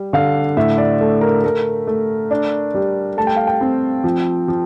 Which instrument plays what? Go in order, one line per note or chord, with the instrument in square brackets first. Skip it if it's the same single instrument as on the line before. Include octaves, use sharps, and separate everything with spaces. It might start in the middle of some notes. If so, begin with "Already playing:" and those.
Already playing: [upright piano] G3
D3 F5
A2 E5
D5
A3
A#4
A3 A#4
A3
D4
G3
A3 A5
G5
F5
G5
C4
F3
F3